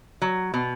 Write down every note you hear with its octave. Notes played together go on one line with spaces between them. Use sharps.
F#3
B2